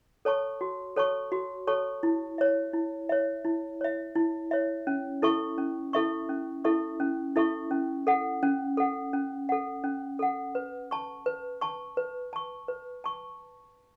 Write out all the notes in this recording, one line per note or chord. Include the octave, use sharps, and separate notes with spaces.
A4 C#5 A5 C#6
F#4
A4 C#5 A5 C#6
F#4
A4 C#5 A5 C#6
E4
C#5 E5
E4
C#5 E5
E4
C#5 E5
E4
C#5 E5
C#4
E4 A4 E5 C#6
C#4
E4 A4 E5 C#6
C#4
E4 A4 E5 C#6
C#4
E4 A4 E5 C#6
C#4
A4 F#5
C#4
A4 F#5
C#4
A4 F#5
C#4
A4 F#5
B4
A5 C#6
B4
A5 C#6
B4
A5 C#6
B4
A5 C#6